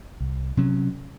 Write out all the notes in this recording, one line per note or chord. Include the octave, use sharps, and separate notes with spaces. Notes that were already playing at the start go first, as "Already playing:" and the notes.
C2
C3 F#3 C#4